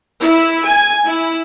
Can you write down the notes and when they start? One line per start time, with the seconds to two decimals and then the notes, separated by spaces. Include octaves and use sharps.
0.21 E4
0.65 G#5
1.05 E4